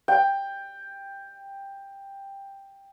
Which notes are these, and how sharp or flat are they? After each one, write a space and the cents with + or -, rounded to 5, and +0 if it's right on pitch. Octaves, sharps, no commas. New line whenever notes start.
G5 +10